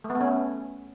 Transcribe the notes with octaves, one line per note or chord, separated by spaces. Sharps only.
A3
B3
A3
C#4